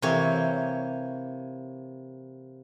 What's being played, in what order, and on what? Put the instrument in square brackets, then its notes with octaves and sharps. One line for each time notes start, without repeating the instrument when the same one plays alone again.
[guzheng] C3 E3 A#3 C#5